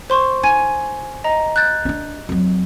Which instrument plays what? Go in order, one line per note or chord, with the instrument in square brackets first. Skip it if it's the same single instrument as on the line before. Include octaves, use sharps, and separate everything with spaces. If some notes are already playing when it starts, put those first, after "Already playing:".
[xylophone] C5 C6 C#6
[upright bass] D#4 [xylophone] G#5 G#6 D#7
[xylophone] D#5 A#5
F#6 G6 A6
[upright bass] C#4 D4
F2 F#3